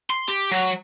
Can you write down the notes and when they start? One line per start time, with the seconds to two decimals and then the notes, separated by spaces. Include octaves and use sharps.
0.10 C6
0.28 G4
0.51 F#3